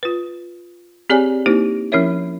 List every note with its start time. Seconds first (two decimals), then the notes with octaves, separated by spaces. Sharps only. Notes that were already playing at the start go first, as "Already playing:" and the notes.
0.03 F4 B4
1.10 C4 G4 G#4 C#5 D5 G#5
1.46 A#3 D#4 E4 G4 C5
1.92 F3 C#4 E4 A#4 C#5 E5